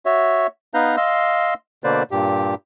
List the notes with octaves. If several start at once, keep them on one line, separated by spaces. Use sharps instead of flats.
F#4 C#5 E5
B3 D#4 B4 F5 A#5 G6
D#5 F5 C6 E6
B2 D3 A#3 B4 C5 D5
G2 A#2 G4